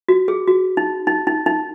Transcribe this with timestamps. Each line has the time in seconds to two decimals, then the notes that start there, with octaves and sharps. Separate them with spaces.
0.09 F#4
0.28 G#4
0.48 F#4
0.77 D#4
1.07 D#4
1.27 D#4
1.46 D#4